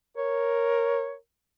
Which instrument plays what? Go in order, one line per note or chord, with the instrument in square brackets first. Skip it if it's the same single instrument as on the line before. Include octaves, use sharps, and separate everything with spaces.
[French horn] A#4 [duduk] C#5